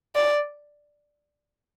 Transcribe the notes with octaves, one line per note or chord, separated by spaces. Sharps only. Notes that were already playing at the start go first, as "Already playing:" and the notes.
D5